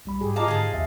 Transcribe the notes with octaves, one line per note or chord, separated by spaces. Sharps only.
B1 G3 B5
G#2 G4 G#4
F4 D#5 F5 A5 A#5 D6
G#2 D3 G#4 A5
A#1 E2 E5